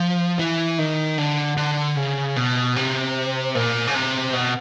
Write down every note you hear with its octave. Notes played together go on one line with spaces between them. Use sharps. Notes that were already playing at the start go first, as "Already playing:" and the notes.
Already playing: F3
E3
D#3
D3
D3
C#3
B2
C3
A#2
C#3
C3
B2